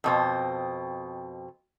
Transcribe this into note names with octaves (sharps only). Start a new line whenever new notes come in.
F2 B2 C4